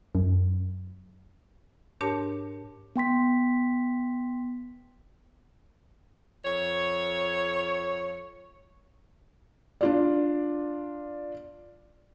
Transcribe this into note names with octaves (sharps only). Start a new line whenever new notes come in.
F#2
G#2 D4 G4 A#4 C#5 A5
B3 G5 C6 B6
F2 C#5
D4 F4 D5